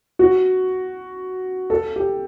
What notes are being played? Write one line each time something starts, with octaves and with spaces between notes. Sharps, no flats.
F#4
A4
G4